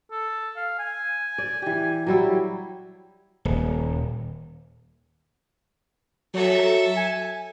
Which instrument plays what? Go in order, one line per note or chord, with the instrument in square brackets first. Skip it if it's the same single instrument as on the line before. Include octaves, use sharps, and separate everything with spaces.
[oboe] A4
F5
G#5
[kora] D5
E3 G4
F#3 G3 E4
[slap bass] D#1
[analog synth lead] F#3 [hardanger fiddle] A4 E5
[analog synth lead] G#5